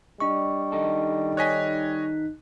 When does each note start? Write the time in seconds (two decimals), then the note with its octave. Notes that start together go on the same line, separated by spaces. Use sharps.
0.20 G3 D4 D#5 C#6
0.72 D#3 D#4 A4
1.37 C#5 D#5 G#5 F#6 B6